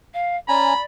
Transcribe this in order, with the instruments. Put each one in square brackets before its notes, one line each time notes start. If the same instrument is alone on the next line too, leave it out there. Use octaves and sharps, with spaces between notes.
[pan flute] F5
[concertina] C#4 G#5 A#5 [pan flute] D5 [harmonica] B5